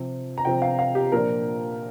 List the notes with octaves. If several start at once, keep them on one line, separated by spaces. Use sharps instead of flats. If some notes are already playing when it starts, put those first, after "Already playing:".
Already playing: C3 F3 C4
A#5
C3 F3 C4 G5
F5
F5
G4
A#2 F3 D4 A#4